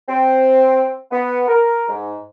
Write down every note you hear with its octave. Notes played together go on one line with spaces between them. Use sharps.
C4
B3
A#4
G#2